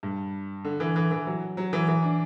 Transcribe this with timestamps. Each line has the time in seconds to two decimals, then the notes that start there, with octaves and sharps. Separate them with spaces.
0.03 G2
0.64 D3
0.80 E3
0.96 E3
1.11 E3
1.27 F#3
1.57 F#3
1.73 E3
1.88 E3
2.03 D4